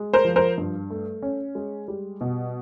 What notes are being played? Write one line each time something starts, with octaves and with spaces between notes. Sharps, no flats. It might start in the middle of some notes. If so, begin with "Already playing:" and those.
Already playing: G#3
A#4 C5
F3
A#4 C5
G2
A3
C#4
G#3
G3
B2